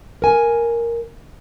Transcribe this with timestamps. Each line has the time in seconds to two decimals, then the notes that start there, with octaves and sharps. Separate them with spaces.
0.22 A#4 G#5